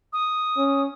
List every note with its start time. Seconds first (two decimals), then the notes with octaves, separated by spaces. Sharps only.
0.13 D#6
0.58 C#4